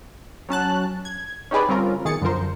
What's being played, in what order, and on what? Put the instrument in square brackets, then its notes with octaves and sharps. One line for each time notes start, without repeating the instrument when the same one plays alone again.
[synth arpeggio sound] F#3 C#4 A5 F#6
G#6
C#4 D#4 G4 G#4 B4 D5
D3 G3 C4 C#4 F4 A#4
B1 D#3 G#4 A6 C#7
F#2 D3 F3 A#4 C5